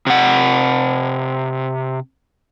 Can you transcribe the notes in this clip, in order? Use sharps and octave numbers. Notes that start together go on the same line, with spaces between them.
C3 F#5